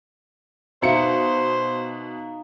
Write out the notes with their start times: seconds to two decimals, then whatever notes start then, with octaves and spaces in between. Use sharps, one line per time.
0.82 B2 D#4 C5 E5 F5 C#7